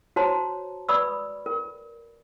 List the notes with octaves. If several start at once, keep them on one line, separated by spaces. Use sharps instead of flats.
F#4 C5 C#5 A5 A#5 C6
B4 D5 B5 C#6 D#6 E6
A#4